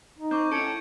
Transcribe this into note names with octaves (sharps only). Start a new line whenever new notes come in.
D#4
C4 C#6 D6 G6
C#4 E4 A4 G#6 C#7 D7